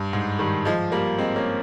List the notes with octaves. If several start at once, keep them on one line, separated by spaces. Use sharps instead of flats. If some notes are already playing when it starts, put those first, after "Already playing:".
Already playing: G2
G#2
D#3 G3
F3 G#3
G3 A#3
G#3 C4
A#3 C#4